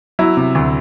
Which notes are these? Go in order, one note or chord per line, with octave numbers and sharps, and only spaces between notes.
F#3 E4
C3
D2